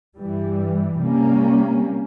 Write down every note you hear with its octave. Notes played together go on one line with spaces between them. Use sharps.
G2 E3 G3
C3 G3 A#3 C#4